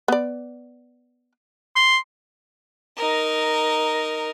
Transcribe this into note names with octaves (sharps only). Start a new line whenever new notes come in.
B3 D5
C6
D#4 A#4